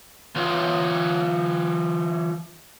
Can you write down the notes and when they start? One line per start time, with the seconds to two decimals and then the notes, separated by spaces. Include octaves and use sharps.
0.36 E3 F4 C#5